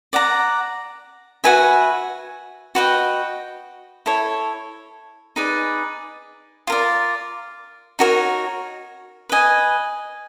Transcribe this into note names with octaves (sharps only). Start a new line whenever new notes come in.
D5 F#5 A#5
F#4 B4 E5 G#5
F#4 B4 D#5 G5
E4 A4 C#5
D#4 G#4 B4 D5
F4 A#4 D5
D#4 F#4 A#4 C#5
B4 D#5 G#5